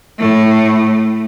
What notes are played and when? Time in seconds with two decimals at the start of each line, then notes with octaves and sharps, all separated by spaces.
0.19 A2 A3